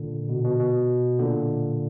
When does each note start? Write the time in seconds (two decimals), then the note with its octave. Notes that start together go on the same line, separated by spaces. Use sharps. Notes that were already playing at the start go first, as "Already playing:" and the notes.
Already playing: A#2 D3
0.29 B2
0.44 B2
0.59 B2
1.19 A#2 D3